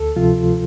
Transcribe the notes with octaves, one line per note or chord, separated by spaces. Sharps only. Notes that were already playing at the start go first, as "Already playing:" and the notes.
Already playing: D2 A4
C3 F3 F4